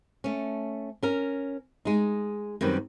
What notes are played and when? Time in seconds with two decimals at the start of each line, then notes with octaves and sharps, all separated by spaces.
0.24 A3 C#4
1.03 C#4 A#4
1.85 G#3 D#4
2.61 F#2 D#3 G3 C4 B4